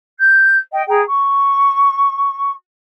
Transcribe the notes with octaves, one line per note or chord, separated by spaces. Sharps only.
G6
D#5 G5
G#4 G5 A#5
C#6